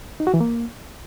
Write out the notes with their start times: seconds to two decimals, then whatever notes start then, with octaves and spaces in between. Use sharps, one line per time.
0.20 D#4
0.27 F#4
0.34 E3
0.40 A#3